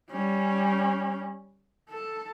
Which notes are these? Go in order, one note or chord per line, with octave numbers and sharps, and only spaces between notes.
G3 C#4
A4 A5